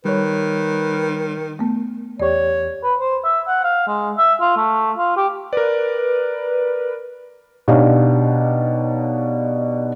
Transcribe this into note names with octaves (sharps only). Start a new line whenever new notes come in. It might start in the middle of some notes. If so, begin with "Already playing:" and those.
D#3 G3 B4 C#5
A3 B3
E2 G4 C#5 D5 C#6
B4
C5
E5
F#5
F5
G#3
E5
F4
A3
F4
G4
A#4 B4 D5
B2 D4 D#4 G4 C#5 F5